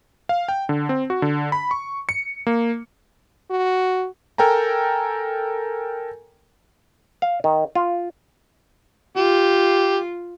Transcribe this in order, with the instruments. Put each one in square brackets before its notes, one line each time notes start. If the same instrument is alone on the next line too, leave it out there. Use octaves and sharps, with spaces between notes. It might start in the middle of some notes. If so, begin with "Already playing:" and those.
[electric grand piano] F5
G5
D3
C4
F#4
D3
B5
C#6
C#7
A#3
[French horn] F#4
[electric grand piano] A4 A#4 G5 G#5 A#5
[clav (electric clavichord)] F5
D#3
F4
[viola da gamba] F4 [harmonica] G4